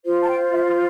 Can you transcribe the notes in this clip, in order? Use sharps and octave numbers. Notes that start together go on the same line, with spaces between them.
F4 C5
A5
G5
E5